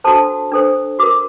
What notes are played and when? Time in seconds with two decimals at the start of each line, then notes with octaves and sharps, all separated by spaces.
0.04 D4 F#4 A4 C5 A5
0.52 D4 A4 C5
0.99 F#4 A#4 D6